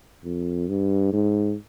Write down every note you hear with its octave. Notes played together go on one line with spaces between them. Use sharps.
F2
G2
G#2